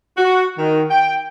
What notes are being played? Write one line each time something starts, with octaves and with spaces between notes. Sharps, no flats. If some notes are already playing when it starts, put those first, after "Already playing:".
F#4
D#3
G5